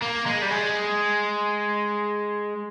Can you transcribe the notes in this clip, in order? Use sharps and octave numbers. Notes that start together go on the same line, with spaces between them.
A#3
G#3
G3
G#3